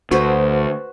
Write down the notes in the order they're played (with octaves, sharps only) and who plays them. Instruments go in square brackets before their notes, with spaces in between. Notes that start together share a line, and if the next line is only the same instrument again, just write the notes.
[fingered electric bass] D2 [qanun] F#4 B4 C5